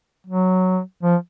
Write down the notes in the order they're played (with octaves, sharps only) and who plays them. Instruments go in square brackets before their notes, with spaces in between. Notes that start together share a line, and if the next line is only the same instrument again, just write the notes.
[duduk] F#3
F3